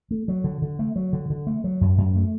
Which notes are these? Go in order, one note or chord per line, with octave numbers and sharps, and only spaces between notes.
A3
F#3
D3
D3
A3
F#3
D3
D3
A3
F#3
F#2
F#2
A3